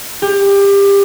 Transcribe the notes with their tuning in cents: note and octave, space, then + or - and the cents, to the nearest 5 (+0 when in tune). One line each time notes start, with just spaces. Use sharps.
G4 +25